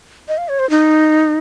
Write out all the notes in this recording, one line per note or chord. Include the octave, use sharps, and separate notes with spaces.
D#5
F5
C#5
C5
D#4